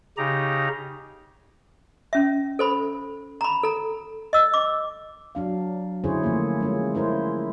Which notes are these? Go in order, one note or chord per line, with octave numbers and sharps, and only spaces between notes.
C#3 D#4 G4 A#5
C#4 E5
A4 C5 B5
A#5 B5
A4 A#5
D#5 E6
D6
F#3 D4 F5
D3 C#4 E4 G#4 C5 C#5
D3 F3 A3 A#3
G#3 C#4 F4
C#4 E4 A#4 C5